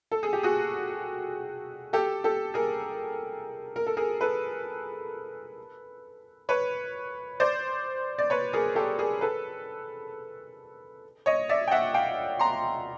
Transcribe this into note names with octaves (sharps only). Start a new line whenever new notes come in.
A4
G#4
G4
F#4 G#4
G4 A4
G4 A4
G#4 A#4
A#4
A4
G#4 A#4
A4 B4
B4 C#5
C5 D5
D5
B4 C#5
G#4 A#4
G4 A4
G#4 A#4
A4 B4
C#5 D#5
D5 E5
G5
E5 F#5
F5 G5
A#5 C6